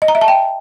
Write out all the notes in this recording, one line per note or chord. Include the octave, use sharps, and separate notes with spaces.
D#5
A#5
E5
A5
G5